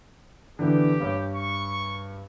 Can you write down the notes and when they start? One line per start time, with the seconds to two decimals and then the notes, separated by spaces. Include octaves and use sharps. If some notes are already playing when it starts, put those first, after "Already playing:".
0.59 D3 E3 B3 G4
1.00 G2 C#5
1.35 C#6